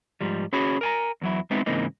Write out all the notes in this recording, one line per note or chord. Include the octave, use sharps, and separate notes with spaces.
G#2 F3 G3
C#4 F#4 G#4 C#5 B5
A#4 G#5 A#5
E2 F#3 E4
G#3 B3 C4 D#4 E4
G#2 C#3 E3 A#3 C4 D#4